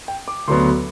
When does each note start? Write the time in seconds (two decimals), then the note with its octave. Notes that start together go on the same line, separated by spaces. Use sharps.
0.08 G5
0.28 D6
0.48 D2 D3 F#3 B3 C6